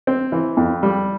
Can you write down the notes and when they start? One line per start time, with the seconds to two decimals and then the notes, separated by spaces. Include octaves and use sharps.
0.07 C4
0.32 E3
0.57 F2
0.83 G3